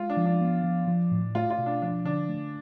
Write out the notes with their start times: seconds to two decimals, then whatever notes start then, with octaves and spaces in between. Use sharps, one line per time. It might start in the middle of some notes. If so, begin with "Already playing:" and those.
Already playing: G#3 F4
0.10 D4
0.17 F3
0.25 D4
0.41 B3
0.64 F3
0.87 F3
1.11 A2
1.35 A3 F4
1.50 F4
1.58 B2
1.66 D4
1.82 F3 D4
2.05 D3 D4
2.29 A3